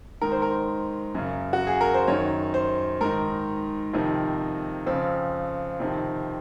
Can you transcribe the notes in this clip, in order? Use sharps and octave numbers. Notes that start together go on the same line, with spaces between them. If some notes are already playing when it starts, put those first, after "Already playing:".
G#2 D#3 A#4
C5
A#4
F#2 C#3
F#4
G#4
A#4
C5
F#2 D#3 C#5
C5
G#2 D#3 A#4
F2 C3 D#3
F2 C#3 C4
F2 C3 D#3